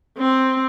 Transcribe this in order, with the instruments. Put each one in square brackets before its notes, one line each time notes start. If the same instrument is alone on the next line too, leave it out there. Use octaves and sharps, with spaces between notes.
[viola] C4